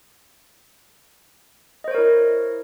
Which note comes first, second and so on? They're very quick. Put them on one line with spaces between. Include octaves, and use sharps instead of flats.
D#5 C5 C#5 A#4 E4